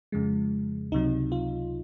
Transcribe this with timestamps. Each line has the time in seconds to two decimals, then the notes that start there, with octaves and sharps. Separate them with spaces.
0.12 F2 C#3 F3 G#3
0.92 C#2 C3 F#3 D#4
1.32 F4